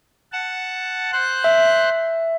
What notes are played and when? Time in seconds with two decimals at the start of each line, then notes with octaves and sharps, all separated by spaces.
0.32 F#5 A5
1.12 C5 F#6
1.44 E5